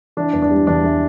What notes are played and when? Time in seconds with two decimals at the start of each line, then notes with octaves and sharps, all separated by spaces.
0.17 E3 D4
0.33 E2
0.42 D4
0.51 G3
0.67 E2 D4
0.84 E3